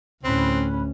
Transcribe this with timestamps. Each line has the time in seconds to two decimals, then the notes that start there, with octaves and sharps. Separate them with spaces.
0.24 D2 A2 C4 C#4 B5 F#6